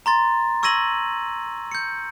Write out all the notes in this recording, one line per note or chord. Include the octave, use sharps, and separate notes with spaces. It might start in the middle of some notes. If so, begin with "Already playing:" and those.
A#5 C6 A6
C#6 E6 G#6 A#6 D#7 F#7
G6 C#7